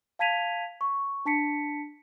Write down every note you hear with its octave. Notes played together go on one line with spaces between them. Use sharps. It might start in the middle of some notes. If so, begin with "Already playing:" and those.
F5 A5 G#6 B6 D#7 F7
C#6
D4 A5 B6 C#7